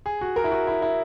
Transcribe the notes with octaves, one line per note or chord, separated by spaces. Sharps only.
G#4
F#4
A#4
E4
F#4
E4
E4